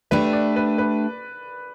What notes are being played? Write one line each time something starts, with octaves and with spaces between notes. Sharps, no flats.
A3 D4 G4 B4
D5
B4
B4